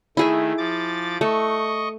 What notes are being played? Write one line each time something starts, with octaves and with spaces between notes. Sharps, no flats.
D#3 A3 E4 G#4 E5
F3 D6 A6
A3 D#5 C#6